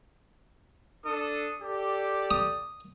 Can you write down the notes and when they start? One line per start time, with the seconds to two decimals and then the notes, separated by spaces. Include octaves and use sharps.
1.05 D4 A4 D#6
1.62 G4 A4 D5
2.31 D#6